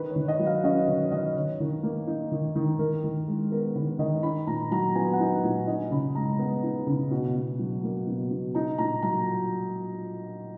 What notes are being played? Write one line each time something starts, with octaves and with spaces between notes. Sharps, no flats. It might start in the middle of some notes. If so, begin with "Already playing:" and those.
Already playing: D#3 B4
C#5
D#3
D#5
F#3
F5
C#4 D#5
D#3 C#5
D#3 D#5
D#3 C#5
D#3
A#3
D#4
D#3
D#3
D#3 A#4
D#3
G#3
B3 A#4
D#3 B4
D#3 D#5
D#4 B5
A#2 A#5
F#3 A#5
B3 G#5
F#5
D#4
A#2
D#4 D#5
C#3 B5
G#3 A#5
B3
D#4
C#3
B2
B2
F#3
A#3
B2
B2
D#4 A#5
A#2 A#5
F#3 A#5